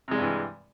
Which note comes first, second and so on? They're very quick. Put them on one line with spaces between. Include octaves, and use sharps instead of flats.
C3 G#3 G3 G2 E3